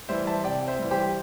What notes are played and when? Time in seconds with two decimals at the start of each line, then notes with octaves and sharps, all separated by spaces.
0.09 E3 G3 C5 E5
0.27 E5 A5
0.44 C3 D5 G5
0.68 C5 E5
0.79 E3 G3
0.91 G4 C5